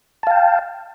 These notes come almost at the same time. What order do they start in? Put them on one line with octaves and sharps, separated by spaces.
A5 F5 G5